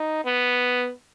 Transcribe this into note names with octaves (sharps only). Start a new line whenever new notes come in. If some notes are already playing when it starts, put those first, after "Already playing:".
Already playing: D#4
B3